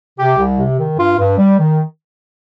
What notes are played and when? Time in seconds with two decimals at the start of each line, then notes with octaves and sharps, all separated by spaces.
0.17 C3 G4
0.38 C2
0.58 C3
0.78 D#3
0.97 G2 F4
1.18 G2
1.38 G3
1.58 D#3